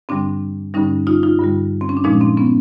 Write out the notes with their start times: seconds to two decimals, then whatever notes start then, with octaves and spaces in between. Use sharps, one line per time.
0.09 G2 D3 G3 C4 D4
0.74 G2 D3 G3 C#4 D#4
1.07 D#4 F4
1.23 D#4 F4
1.39 G2 D3 G3
1.81 C4
1.89 C#4
1.97 D4
2.04 A#2 F3 G#3 C#4 D#4
2.21 C4 D4
2.37 B3 C#4